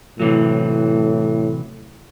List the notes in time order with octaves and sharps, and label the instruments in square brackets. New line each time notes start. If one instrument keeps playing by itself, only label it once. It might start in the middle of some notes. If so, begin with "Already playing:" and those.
[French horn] A2 [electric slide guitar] C3 E3 F#3